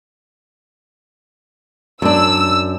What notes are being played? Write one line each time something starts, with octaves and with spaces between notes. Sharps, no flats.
F#2 D4 E6